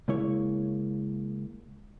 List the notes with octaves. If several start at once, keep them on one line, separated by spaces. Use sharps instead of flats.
C#3 G#3 A#3 E4 C#5